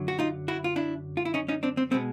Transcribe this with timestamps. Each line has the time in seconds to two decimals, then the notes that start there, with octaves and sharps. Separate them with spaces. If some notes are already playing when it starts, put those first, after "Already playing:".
Already playing: F#2 D3 F#3
0.08 F#4
0.19 D#4 F4
0.48 E4 F#4
0.64 F4
0.76 D4 E4
1.17 F4
1.25 E4
1.34 C#4 D#4
1.48 C#4 D#4
1.63 C4 D4
1.77 C4
1.91 B2 G#3 B3 C4